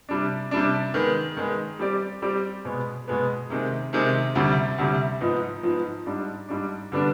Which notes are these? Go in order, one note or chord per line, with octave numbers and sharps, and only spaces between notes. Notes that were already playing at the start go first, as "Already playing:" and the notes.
C3 G3 D4
C3 G3 D4
D#3 G#3 B3
D#3 G#3 B3
G3 C4 G4 D5
G3 C4 G4 D5
B2 G#3 B3
B2 G#3 B3
C3 D#3 G#3 C4
C3 D#3 G#3 C4
D2 C3 G3
D2 C3 G3
G#2 F3 B3 D#4
G#2 F3 B3 D#4
G#2 G3 D4
G#2 G3 D4
D3 G3 B3 D4